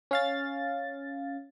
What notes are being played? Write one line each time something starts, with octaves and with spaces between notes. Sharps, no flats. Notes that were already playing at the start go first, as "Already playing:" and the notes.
C#4 F5 A6